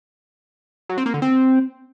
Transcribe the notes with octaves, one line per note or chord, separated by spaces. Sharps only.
F#3
C4
A#3
D3
C4